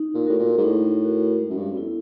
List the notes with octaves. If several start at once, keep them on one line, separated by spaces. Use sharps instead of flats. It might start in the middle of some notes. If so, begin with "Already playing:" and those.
Already playing: D#4
A#2
A2 F#4 A#4
A#2
G#2
A2 D#4
F#4 A#4
G#3
F#2
G2
F#2
B3 E4 A4